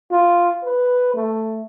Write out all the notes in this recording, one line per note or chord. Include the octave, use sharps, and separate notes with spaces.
F4
B4
A3